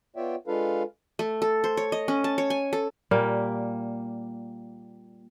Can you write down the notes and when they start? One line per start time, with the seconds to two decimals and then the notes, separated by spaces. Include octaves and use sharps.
0.16 B3 F4 C#5 D5 E5 G5
0.47 G#3 D4 F4 A4 B4 F5
1.19 A3
1.42 A4
1.64 C5
1.77 C#5
1.92 D#5
2.08 C#4
2.24 A5
2.38 C#5
2.50 G#5
2.73 A4
3.11 A#2 G3 A#3